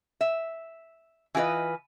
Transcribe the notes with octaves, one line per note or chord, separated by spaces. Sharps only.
E5
E3 F4 G4 B4 D#5